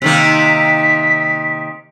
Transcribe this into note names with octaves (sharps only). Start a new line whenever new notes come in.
C3 D#3 A#3 B6